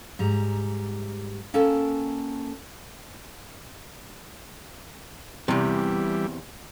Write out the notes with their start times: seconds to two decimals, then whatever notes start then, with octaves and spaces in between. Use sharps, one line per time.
0.19 G#2 G3 A#5
1.54 A#3 C#4 A4 G5 A5
5.48 E2 C3 E3 G3